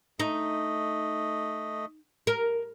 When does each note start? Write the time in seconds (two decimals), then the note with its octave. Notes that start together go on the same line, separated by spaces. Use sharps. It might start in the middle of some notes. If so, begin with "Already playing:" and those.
0.20 A3 D#4 D#5
2.27 A#4